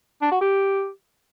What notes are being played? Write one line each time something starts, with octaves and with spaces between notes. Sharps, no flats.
D4
F#4
G4